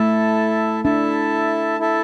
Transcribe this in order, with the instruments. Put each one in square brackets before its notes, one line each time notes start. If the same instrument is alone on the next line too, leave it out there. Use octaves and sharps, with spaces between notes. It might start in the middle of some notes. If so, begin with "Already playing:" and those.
Already playing: [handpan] A3 [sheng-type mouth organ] E4 A4 E5 A5
[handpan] D4 [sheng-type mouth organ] E4 A4 E5 A5
[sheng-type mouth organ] E4 A4 E5 A5